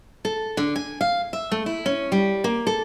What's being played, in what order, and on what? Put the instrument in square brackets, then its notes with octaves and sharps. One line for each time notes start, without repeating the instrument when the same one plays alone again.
[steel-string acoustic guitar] A4
D3
G#5
F5
E5
A3
E4
C#4
G3
A#3
A4